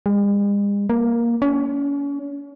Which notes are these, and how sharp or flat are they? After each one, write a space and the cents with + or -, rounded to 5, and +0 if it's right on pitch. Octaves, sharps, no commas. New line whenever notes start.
G#3 -45
A#3 +10
C#4 +35